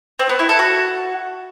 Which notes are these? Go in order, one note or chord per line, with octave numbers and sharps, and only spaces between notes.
C4
B3
E4
A4
F#4